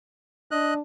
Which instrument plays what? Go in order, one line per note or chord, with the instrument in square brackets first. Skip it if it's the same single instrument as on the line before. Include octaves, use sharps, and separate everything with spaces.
[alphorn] D4 [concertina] D#5 F#6